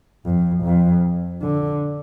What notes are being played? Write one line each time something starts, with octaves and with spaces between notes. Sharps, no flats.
F2
F2
D3